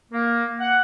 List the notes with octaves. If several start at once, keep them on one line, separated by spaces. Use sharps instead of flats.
A#3
F#5